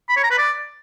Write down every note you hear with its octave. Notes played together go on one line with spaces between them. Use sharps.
B5
C#5
A#5
B4
D5